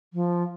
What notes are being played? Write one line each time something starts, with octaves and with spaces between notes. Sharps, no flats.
F3